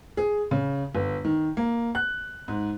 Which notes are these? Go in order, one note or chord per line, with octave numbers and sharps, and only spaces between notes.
G#4
C#3
G1
D#3
A#3
F#6
G#2